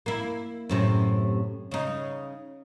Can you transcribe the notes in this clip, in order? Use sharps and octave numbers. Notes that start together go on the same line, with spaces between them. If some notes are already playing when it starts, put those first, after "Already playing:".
A#3 E4
F#2 A2 C3
C#3 D#4